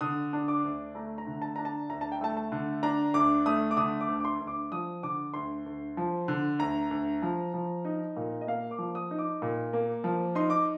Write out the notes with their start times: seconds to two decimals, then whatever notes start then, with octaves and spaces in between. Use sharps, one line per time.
0.01 D3 D#6
0.33 D4
0.48 D6
0.64 D2
0.95 A3 A#5
1.18 A#5
1.27 D3
1.42 A5
1.56 D4 A#5
1.65 A5
1.89 D2 A#5
2.01 A5
2.12 G5
2.21 A3 A5
2.37 A5
2.52 D3
2.83 D4 A#5
3.14 D2 D6
3.46 A3 D#6
3.71 D6
3.77 D3 D#6
4.01 D6
4.08 D2
4.20 D6
4.25 C6
4.41 D2
4.47 D6
4.72 F3 D#6
5.03 D3 D6
5.34 D2 C6
5.66 D2
5.97 F3
6.28 D3
6.59 D2 A#5
6.91 D2
7.22 F3
7.54 F3
7.85 D#4
8.17 A#2
8.41 D#5
8.47 A#3 F5
8.71 D6
8.78 F3
8.95 D#6
9.11 D#4
9.19 D6
9.42 A#2
9.73 A#3
10.04 F3
10.35 D#4 C6
10.50 D6